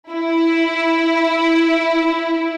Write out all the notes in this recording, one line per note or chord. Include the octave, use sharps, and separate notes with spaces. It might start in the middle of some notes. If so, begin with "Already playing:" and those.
E4